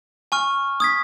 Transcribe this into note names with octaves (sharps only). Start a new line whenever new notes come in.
G#5 C#6 F6
D#6 G#6 B6